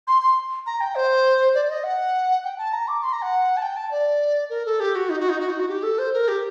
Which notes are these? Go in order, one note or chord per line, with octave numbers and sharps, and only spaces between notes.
C6
C6
A#5
G5
C5
D5
D5
D#5
F#5
G5
A5
A#5
D6
C6
A#5
F#5
A5
G5
A5
D5
A#4
A4
G4
F#4
D#4
F#4
D#4
F#4
D#4
F#4
G4
A4
C5
A#4
G4